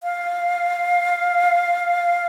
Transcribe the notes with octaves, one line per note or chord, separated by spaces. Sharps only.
F5